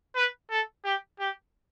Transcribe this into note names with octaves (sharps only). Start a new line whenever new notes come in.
B4
A4
G4
G4